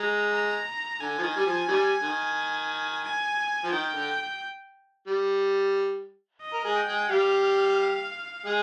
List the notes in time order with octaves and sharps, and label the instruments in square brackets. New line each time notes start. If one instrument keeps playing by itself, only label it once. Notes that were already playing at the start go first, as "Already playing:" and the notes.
Already playing: [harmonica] G#3 [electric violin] A#5
[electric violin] A#5
[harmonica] D3 [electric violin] G#5
[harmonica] F3
D#3
G3
F3
D#3 G3
D#3
[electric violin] G#5
[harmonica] F3
[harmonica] D#3 [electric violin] G5
[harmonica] D3
G3
[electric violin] D#5
[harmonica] A#4
G#3 G#4
[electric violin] G5
[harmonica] G#3 G#4
[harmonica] G3 G4 [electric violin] F5
[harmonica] G#3 G#4